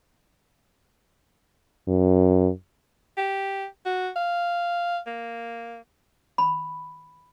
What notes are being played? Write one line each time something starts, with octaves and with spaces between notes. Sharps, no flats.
F#2
G4
F#4
F5
A#3
B5